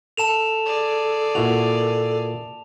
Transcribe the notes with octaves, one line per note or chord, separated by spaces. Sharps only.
A4 A5 E7 F7
G#4 D5
A#2 E4 F#4 F7